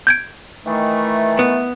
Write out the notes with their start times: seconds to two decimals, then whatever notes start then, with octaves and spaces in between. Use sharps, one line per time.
0.07 G6 G#6 D7
0.66 D#3 E3 A3
1.39 B3